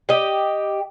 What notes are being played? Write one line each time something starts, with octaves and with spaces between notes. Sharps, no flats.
G4 D#5